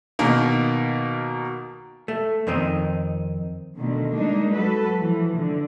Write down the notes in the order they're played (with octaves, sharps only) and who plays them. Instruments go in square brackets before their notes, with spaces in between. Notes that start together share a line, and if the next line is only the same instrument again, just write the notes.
[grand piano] B2 D#3 A#3
[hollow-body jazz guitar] A3
F2 D#3 C4 D#4
[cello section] B2 D3 D#3 A3
G3 G#3 A#3 D4 D#4
F#3 F#4 A4 B4
E3 F3 A3
D3